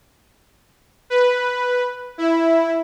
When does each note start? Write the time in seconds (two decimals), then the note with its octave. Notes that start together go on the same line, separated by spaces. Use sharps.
1.10 B4
2.18 E4